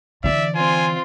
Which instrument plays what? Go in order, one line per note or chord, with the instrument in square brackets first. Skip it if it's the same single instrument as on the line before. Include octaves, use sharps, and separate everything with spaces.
[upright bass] D3 E3 [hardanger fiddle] D5 [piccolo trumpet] E5
[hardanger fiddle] C4 F4 [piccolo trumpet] G#5